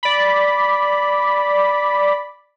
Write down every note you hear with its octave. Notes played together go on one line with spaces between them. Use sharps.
D5 B5